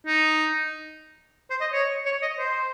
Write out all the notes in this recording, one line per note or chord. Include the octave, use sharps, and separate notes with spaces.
D#4
C5
D#5
C#5
C#5
D#5
C5